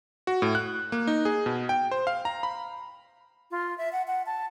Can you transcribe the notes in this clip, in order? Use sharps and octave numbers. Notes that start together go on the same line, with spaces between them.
F#4
A2
F#6
A#3
D#4
G#4
B2
G5
C5
F5
A#5
B5
F4
E5
F#5
F#5
A5